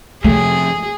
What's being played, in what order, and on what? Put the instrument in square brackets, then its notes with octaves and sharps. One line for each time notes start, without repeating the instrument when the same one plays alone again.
[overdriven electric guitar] F2 C3 [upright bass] A3 [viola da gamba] G#4